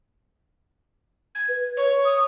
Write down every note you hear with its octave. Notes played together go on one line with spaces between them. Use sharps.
G#6
B4
C#5
D#6